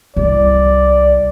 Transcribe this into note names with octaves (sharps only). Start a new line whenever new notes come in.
C2 D5